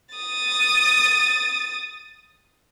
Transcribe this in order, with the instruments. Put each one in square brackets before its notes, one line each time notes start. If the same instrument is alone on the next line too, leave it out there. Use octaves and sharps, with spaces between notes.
[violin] D#6 A6